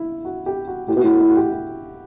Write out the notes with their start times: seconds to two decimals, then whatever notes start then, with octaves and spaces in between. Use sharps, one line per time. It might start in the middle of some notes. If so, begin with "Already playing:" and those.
Already playing: E4
0.25 F#4
0.46 G4
0.67 F#4
0.88 A2 G4
0.96 B2 E4
1.04 A2 F#4
1.20 E4
1.29 F#4
1.36 G4
1.52 E4